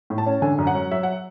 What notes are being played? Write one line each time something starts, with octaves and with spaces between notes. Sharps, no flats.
A2
A5
C#4
D3 G#5
F#2
F#5
F#3
F#3 E5
F#5